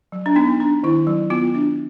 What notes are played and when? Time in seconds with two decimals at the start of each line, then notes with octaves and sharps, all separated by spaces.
0.12 F#3
0.26 D4
0.36 B3 D#4
0.60 D4
0.83 D#3 E4
1.07 F#3
1.30 B3 F4
1.55 D4